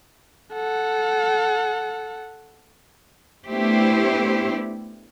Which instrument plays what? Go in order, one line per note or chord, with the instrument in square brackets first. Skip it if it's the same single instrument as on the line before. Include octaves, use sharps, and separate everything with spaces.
[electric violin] A4 F#5
[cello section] A3 B3 D4 E4 G4 C5